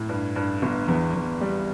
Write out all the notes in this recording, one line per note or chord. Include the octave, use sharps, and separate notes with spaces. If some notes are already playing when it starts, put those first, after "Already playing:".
Already playing: A2
G2
G2
G1
E2
E2
G3